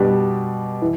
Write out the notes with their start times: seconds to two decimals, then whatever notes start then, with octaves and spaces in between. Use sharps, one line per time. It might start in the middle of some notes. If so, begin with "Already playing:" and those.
Already playing: B2 G3 D4 G4
0.82 E3